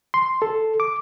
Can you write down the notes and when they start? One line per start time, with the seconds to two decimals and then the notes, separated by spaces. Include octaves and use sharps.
0.14 C6
0.42 A4
0.80 D6